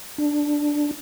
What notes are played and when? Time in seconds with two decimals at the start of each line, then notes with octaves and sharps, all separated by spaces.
0.18 D4